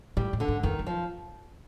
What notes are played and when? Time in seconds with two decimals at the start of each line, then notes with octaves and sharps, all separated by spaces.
0.17 A2 G3
0.33 A2
0.40 D3
0.48 G#2
0.63 F2 D#3
0.79 F#2
0.86 F3